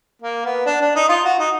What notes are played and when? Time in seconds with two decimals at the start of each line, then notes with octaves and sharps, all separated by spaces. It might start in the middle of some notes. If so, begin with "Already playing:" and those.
0.22 A#3
0.45 B3
0.66 D4
0.81 D4
0.95 D#4
1.09 F4
1.24 F#4
1.39 D#4